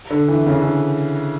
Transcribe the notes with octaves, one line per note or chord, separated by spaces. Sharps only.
D3
E3
C#3
D3